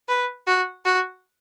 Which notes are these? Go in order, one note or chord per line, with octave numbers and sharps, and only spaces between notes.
B4
F#4
F#4